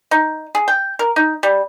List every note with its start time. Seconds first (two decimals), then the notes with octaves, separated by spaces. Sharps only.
0.11 D#4
0.55 G#4
0.68 G5
0.99 A#4
1.16 D#4
1.43 G3